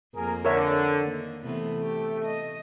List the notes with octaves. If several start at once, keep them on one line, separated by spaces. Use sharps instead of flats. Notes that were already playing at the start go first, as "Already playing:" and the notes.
F2 A#3 G#4 A#4
D3 A#4 C#5 E5
D#3 A#3
C3 E3 A3 B3
G4
D#5